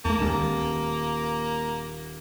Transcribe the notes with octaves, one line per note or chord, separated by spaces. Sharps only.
E2 A3 A#3 A5
D#1 D2 D#3 G#3 E7